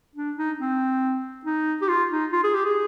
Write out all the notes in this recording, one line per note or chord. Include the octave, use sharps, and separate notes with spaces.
D4
D#4
C4
D#4
G4
F4
D#4
F4
G#4
G4
G#4